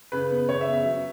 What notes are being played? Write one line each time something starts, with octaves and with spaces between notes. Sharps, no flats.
C#3 B4
B3
C#3 C#5
E5
B3
E5
F#3